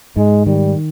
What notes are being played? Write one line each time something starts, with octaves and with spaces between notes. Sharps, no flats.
G#2 G#3
D#3 G3